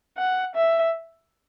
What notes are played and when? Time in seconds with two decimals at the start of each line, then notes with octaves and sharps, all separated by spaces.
0.18 F#5
0.56 E5